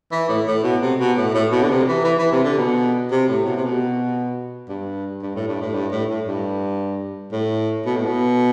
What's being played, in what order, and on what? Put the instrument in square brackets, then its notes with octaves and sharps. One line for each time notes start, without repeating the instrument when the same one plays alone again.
[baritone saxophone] E3
A2
A2
B2
C3
B2
A2
A2
B2
D3
C3
E3
E3
E3
C3
D3
B2
C3
A2
B2
C3
B2
G2
G2
A2
G2
A2
G2
A2
A2
G2
A2
B2
A2
B2